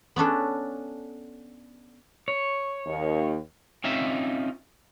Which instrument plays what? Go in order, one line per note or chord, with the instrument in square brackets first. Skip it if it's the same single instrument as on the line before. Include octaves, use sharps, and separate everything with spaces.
[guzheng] B3 C#4 D4 A4
[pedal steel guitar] C#5
[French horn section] D#2
[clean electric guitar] C4 C#4 D#4 F4 E5